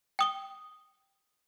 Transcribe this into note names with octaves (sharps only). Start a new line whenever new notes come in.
G5 D#6 G7